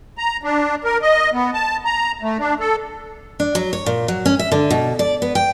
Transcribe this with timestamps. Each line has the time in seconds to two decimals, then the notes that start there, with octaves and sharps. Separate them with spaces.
0.18 A#5
0.43 D4
0.84 A#4
1.02 D#5
1.33 B3
1.53 A5
1.85 A#5
2.22 A3
2.39 D4
2.60 A4
3.40 D4
3.55 F#3
3.73 C#5
3.86 A#2
4.08 F#3
4.26 C#4
4.39 E5
4.52 D3
4.70 B2
4.99 D5
5.22 B3
5.35 G5